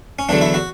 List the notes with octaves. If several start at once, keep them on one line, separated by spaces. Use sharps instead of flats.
C#4
E2 D3 F#3 D4
E4
F#4